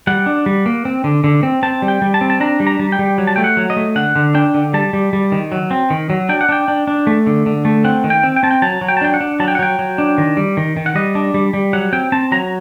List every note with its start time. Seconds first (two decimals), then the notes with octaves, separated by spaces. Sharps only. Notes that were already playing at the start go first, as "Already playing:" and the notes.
0.07 G3 F#5
0.26 D4
0.46 G3
0.66 A#3
0.85 C4
1.04 D3
1.24 D3
1.43 C4
1.63 C4 A5
1.82 G3
1.88 G5
2.02 G3
2.14 A5
2.21 C4
2.30 A5
2.40 D4 A#5
2.60 G3
2.67 A#5
2.79 G3
2.92 G5
2.99 G3
3.18 F#3
3.27 A5
3.36 A3 G5
3.44 F#5
3.57 F#3
3.70 D#5
3.77 A3
3.96 D3 F#5
4.16 D3
4.34 D4 G5
4.54 D3
4.74 G3 A5
4.93 G3
5.13 G3
5.32 D#3
5.52 F#3
5.71 C4
5.90 D#3
6.10 F#3
6.29 D4 G5
6.41 F#5
6.49 D4 G5
6.68 D4
6.87 D4
7.07 A3
7.27 D3
7.46 D3
7.65 A3
7.84 C4 F#5
8.04 D#3
8.10 G5
8.23 C4
8.36 G5
8.43 C4 A5
8.51 G5
8.62 F#3 A5
8.81 F#3
8.88 G5
8.97 A5
9.01 D4 G5
9.14 F#5
9.20 D4
9.40 F#3 A5
9.48 G5
9.55 F#5
9.59 F#3 G5
9.79 F#3
9.98 D4
10.18 D#3
10.37 G3
10.57 D#3
10.77 D#3
10.86 F#5
10.95 G3 D#5
11.15 D4
11.34 G3
11.54 G3
11.73 F#3 F#5
11.93 C4 G5
12.12 C4 A5
12.32 F#3 A#5